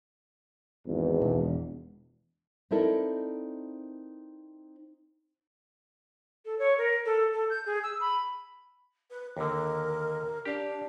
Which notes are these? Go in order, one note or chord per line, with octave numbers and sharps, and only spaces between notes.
G#1 E2
E1
C4 D#4 E4 A4 A#4 D5
A4
C#5
A#4
A4
A4
G6
G#4
E6
B5
B4
D#2 D3 A#4
D4 G4 F5